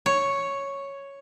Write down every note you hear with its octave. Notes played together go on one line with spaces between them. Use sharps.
C#5